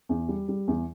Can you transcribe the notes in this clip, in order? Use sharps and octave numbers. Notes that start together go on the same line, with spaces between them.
E2
G3
G3
E2